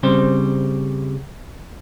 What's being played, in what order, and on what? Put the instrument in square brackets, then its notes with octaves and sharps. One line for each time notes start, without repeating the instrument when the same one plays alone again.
[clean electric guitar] C#3 G3 C4 C5